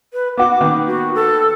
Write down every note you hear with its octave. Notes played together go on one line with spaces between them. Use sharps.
B4
B3 F#4 D6
D#3 A#3 B3
F#4
A4